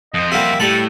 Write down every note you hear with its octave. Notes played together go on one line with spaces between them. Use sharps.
F2 C5 D#5
G3 A#3 F#4 E5
A2 G3 A4 B5